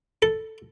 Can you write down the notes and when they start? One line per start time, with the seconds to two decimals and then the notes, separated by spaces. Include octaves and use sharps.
0.22 A4